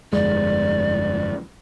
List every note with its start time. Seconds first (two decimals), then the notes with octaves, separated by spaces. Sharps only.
0.13 G1 F2 G#3 D5